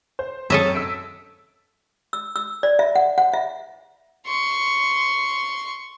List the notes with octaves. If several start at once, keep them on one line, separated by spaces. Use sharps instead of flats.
C5
F#2 C4 A4 C#5 D#5 E5
E6 B6 D7
E6
E6
D5
E5
F#5
F#5
E5
C6 C#6